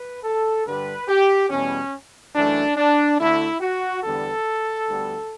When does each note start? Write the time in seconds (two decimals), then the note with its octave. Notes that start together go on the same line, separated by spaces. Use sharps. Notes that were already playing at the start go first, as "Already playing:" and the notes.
Already playing: B4
0.24 A4
0.66 G2 D3 G3 B4
1.08 G4
1.50 E2 B2 G3 C#4
2.35 F#2 E3 A3 D4
2.76 D4
3.18 D2 D3 A3 E4
3.60 F#4
4.03 E2 D3 G3 B3 A4
4.88 D2 D3 G3 B3